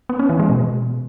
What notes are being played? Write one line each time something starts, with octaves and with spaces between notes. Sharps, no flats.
B3
C#4
E3
G#3
B2